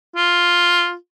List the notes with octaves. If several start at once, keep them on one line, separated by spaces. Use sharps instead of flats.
F4